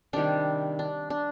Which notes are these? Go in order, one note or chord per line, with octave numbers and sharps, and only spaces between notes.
C3 D#3 G3 D4
D4
D4